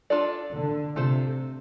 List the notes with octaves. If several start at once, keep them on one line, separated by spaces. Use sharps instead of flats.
D4 F4 A4 D5
D3
C3 A3 F4 A4 C5